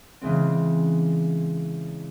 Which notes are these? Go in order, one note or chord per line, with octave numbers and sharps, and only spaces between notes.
C#3 E3 G#3 C4